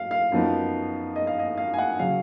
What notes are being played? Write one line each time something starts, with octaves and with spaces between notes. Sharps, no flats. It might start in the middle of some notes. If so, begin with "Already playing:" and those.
Already playing: F#3 F5
F5
F#2 F3 B3 D#4
D#5
F5
D#5
F5
G#5
F#5
C#3 F#3 F5